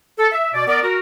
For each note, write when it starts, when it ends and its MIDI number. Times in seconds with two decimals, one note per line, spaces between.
0.18 0.28 69
0.32 0.52 76
0.53 0.64 47
0.53 0.64 74
0.68 0.79 59
0.68 0.79 70
0.68 0.79 74
0.83 0.99 66
0.83 0.99 70